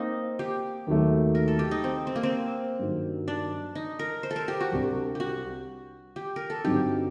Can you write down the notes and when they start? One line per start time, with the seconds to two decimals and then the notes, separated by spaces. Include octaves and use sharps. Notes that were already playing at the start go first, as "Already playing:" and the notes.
Already playing: A#3 C4 D#4
0.39 G4
0.87 D#2 D#3 F#3 A3
1.35 A#4
1.48 A4
1.59 G4
1.71 D#4
1.84 C4
2.07 C4
2.16 A#3
2.23 C4
2.79 G2 D#3 F#3
3.28 D4
3.75 D#4
3.99 A#4
4.23 C5
4.31 A4
4.36 A#4
4.48 G4
4.60 F#4
4.72 C2 C3 G3 D4
5.15 F#4 G4
6.16 G4
6.36 A#4
6.50 A4
6.64 G2 D3 F#3 C4 D#4 G4